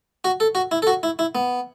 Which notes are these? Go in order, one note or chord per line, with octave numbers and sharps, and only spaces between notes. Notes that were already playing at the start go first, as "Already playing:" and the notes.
F#4
A4
F#4
E4
A4
F#4
E4
E4
B3